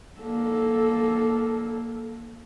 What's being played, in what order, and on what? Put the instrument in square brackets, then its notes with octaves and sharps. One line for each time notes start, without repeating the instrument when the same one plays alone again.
[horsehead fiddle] A#3 A4